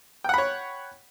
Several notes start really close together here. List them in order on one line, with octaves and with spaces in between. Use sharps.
G5 F#5 B5 C#5